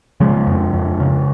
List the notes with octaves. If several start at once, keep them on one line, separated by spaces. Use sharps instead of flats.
C#3 F3 G#3
F2
F2
C#3